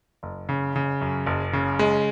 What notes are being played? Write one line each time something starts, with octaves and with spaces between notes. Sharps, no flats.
F#1
C#3
C#3
F#2
F#1
C#3
G#3